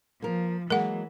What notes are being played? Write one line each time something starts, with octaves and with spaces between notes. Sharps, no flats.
F3 A#3 A#4
E3 F#3 G#3 A#3 A#4 F#5